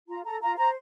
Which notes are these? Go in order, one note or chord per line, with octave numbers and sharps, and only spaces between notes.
F4 A#5
A4 A#5
F4 A#5
C5 A#5